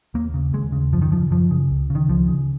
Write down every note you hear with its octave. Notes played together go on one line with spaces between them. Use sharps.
D#2 A#3
C#3
D#2 G#3
C#3
F#2 F3
D#3
C#3 F3
F#2 F3
C#3
C#2
C#3
D#3
C#2 F3
C#3